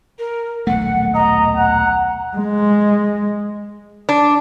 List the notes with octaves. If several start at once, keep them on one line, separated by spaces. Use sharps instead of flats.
A#4
D#1 B1 A3 F#5
D#5 A#5
F#5
G#3
D4